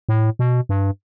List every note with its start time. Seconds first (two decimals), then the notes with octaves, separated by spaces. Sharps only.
0.09 A2
0.39 B2
0.69 G2